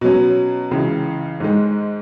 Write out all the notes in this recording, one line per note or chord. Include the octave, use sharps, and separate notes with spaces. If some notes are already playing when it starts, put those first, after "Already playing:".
B2 F#3 C#4
C#2 C#3 E3
G#2 D#3 G#3